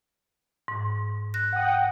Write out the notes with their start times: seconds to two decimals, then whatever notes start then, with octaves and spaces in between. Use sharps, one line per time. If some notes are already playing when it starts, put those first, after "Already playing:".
0.68 G#2
1.34 F#6 A#6
1.52 F#5 G5 D#6